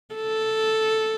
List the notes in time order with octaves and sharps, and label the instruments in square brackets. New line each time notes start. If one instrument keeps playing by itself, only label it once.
[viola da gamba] A4